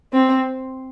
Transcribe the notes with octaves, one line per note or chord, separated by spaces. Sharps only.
C4